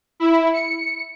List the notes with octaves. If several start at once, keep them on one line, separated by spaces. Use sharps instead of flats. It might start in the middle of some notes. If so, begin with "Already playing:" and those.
E4
C#7